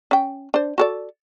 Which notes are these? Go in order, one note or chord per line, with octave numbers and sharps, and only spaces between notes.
C#4 G5
D4 C5
F#4 A4 D5